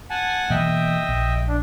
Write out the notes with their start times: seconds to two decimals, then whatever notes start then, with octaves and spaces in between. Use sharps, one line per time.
0.10 F#5 G#5 A5
0.50 B2 E3 A#3 D#5 E5 G5
1.08 A#1
1.48 D4